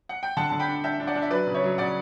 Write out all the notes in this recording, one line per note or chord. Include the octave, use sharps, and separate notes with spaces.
F#5
G5
D3 F#5 A5
D3 A5
G5 B5
D4
D4 E5 G5
D4
D5 F#5
D4
E5
F#3 B4 D5
C#3
C#5 E5
F#3
C#3 D5 F#5